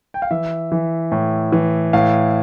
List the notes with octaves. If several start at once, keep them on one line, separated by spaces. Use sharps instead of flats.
G5
F5
E3 E5
E3
A2
E3
A2 F5